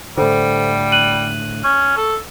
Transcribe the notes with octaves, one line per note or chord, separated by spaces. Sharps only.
A2 D3 G3 A4 C5
F#6 D#7 F#7
C#4 C#6
A4